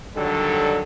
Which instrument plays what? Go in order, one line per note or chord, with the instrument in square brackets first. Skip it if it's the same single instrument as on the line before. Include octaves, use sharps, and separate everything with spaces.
[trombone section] D3 D#3 F#3 G3 A4